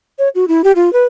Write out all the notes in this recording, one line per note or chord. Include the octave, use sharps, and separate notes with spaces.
C#5
F#4
E4
G4
F4
B4